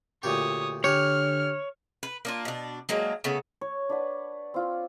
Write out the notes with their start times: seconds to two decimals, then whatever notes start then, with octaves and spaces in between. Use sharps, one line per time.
0.23 D2 A#2 G4 C#5 D#6
0.84 D3 G4 G#4 C#5 F6
2.03 B4
2.25 A#3 D4 F4
2.45 B2 D4
2.89 F#3 G#3 A#3 D4
3.24 C#3 A3 B3
3.61 C#5
3.89 D4 B4 F#5
4.54 C4 F4 G5